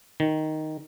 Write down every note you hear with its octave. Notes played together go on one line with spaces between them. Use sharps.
D#3